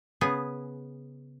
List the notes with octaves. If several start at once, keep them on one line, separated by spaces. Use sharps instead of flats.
C#3 B3 G#4